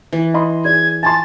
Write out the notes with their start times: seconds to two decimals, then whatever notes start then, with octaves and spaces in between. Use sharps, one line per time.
0.13 E3
0.34 D#5 B5 C6
0.65 G#4 D5 G#6
1.03 G#5 A5 C6 A6